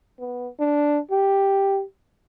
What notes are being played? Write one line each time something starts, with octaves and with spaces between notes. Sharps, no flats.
B3
D4
G4